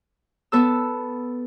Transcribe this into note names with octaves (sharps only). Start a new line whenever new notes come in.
B3 A4 E6